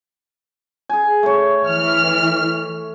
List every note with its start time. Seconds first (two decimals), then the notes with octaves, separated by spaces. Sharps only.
0.89 G#4 G#5
1.23 A3 C#5
1.63 E3 F6